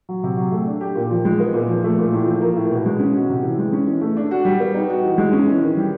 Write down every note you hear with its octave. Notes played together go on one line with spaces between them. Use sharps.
F#3
C3
F#3
A3
D4
G4
A#2
F3
G#3
B3
A#2
F3
A3
A#2
A2
F3
A#3
A2
B2
G#3
C#4
F#4
C3
E3
G#3
C#4
E3
A3
D4
F#4
G3
B3
D#4
F#4
E3
G#3
C#4
E3
D#3
G3